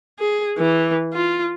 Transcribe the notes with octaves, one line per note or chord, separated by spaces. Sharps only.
G#4
E3
F4